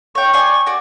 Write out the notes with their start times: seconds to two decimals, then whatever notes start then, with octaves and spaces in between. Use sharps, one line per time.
0.15 C#5 G5 C#6
0.33 C5 D5 G#5
0.66 F#4 D5